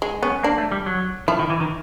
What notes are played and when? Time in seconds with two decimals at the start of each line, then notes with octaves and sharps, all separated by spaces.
0.02 G#3
0.23 B3 C#4
0.43 A#3 D4
0.58 A3
0.72 G3
0.86 F#3
1.28 F3 E4
1.39 D#3
1.50 E3
1.60 D#3